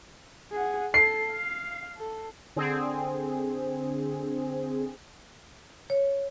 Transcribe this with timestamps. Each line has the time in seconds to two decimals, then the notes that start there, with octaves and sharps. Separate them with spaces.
0.52 G#4 F#5
0.94 A4 C7
1.31 F5
1.97 A4
2.56 D3 C4 G#4
5.90 C#5